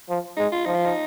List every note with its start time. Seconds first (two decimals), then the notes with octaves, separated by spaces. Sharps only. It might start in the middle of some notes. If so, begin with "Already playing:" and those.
0.09 F3
0.37 G#3 D#4
0.52 F4
0.66 F3 D#4
0.75 F4
0.85 D#4